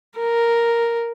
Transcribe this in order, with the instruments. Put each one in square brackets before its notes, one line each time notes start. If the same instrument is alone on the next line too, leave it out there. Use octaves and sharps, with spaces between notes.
[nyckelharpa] A#4